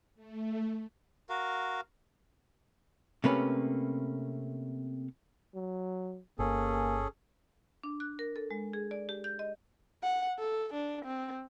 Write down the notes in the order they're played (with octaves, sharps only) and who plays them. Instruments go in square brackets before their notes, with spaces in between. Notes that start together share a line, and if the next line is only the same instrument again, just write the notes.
[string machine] A3
[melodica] F#4 A#4 F5
[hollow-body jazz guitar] C3 A3 A#3 C#4 B4
[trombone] F#3
[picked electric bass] G1 [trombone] A#3 [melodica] C#4 G#4 A4
[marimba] D4
F#6
A#4
A4
G#3
G#4
D5
G4
G6
D#5
[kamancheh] F#5
A4
D4
C4